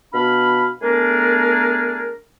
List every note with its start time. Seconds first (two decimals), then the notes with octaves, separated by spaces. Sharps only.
0.13 B2 D4 F5 B5
0.81 A3 B3 D4 G#4 A#4